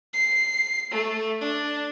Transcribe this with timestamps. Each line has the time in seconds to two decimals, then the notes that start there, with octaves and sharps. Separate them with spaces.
0.13 C7
0.92 A3
1.41 D4